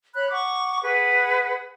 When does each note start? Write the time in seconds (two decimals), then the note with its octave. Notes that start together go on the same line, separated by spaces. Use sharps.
0.15 C#5 B5 F#6
0.31 F#5 C#6 D6
0.82 G#4 B4 F#5